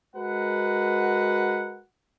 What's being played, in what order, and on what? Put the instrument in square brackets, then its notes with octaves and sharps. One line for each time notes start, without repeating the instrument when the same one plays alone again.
[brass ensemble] G#3 F#4 A#4 B4 F#5